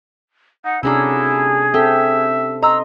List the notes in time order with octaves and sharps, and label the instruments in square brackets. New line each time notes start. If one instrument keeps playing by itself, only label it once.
[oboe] D#4 [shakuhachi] F#5
[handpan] C3 C#4 D4 [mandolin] A#3 F#4 A4 [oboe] E4 [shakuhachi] G#4
[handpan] C4 A4 [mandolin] G4 [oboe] E5
[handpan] D#5 [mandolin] A#5 E6 [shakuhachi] C6